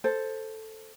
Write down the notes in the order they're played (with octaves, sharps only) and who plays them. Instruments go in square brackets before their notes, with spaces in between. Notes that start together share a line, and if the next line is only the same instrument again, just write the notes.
[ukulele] A4 C5